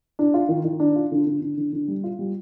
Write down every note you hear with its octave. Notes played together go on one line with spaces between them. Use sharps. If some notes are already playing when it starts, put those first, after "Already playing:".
D4
F4
D#3
D#3
D4
F4
D3
D3
D3
D3
D3
G3
F4
G3